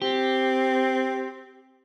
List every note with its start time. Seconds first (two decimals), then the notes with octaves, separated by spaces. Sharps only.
0.02 C4 G4